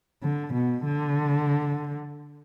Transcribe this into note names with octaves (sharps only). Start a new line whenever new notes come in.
D3
B2
D3